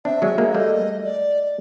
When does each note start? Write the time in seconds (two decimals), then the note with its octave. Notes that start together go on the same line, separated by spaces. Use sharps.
0.05 C4 D4 E5
0.22 F#3 G#3
0.38 G#3 A#3
0.51 E5
0.55 G3 A3 D#5
1.04 D5